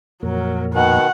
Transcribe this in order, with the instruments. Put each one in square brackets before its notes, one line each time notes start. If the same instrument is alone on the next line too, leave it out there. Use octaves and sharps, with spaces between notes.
[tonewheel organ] F2 A#2 A#4 [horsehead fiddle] F#3
[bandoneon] B2 D#3 [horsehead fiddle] F#5